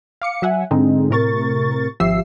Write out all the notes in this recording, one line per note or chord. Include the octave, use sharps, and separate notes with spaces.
F5 D6 C#7
F#3 E5 F#5 G#5
G#2 D3 G#3 C4 D#4
A2 C3 A#4 C#6 A6
G#1 F3 G4 E5 E6 C7